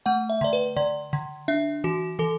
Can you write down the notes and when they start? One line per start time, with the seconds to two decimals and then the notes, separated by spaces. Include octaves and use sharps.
0.06 A3 F#5
0.30 E5
0.41 D3 D5
0.53 B4
0.76 D3 D5
1.13 D3
1.48 D4 E5
1.84 E3 F#4
2.19 E3 A4